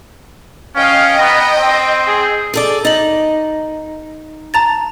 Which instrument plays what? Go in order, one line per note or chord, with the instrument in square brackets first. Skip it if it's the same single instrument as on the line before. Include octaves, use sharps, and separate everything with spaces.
[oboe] C#4 [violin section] D#5 G5 [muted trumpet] F5
[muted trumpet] B3 [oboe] A#5
[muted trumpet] C4
[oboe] G#4
[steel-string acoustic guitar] G#4 A4 D5
[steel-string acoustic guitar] D#4 [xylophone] A6 F#7
[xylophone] A5 A#5 A6